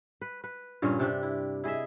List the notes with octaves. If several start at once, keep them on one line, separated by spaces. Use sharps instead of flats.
B4
B4
G2 A#2 C#3 C#4
C3 D4 G4
E4
E4 G#4 D#5 E5